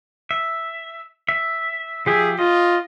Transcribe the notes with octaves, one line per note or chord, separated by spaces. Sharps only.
E5
E5
F3 G4 G#4 E5
F4 D#5